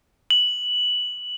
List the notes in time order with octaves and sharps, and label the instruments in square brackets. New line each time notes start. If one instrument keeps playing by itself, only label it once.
[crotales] F#7